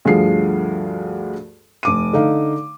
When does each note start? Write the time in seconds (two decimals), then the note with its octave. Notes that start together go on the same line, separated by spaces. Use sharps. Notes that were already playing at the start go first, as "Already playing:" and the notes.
0.05 D2 G2 F3 G#4 C7
1.83 F1 D6 D#7
2.13 D3 D#4 F5